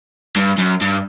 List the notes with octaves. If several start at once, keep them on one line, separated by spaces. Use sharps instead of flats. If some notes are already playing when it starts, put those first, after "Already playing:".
G2
F#2
G2